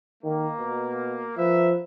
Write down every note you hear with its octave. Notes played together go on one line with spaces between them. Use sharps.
D#3 A#3
B2
F3 A#4 B4 E5